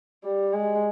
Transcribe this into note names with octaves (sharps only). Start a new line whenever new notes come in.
G3
G#3